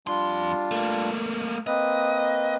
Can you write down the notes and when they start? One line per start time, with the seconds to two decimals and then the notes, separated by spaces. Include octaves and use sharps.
0.07 F2 G3 D4 F4 C6
0.71 A3 A#3
1.67 A#3 C4 B4 D#5